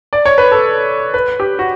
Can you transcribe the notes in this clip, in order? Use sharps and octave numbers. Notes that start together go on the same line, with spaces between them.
D5
C#5
B4
A4
B4
G4
F#4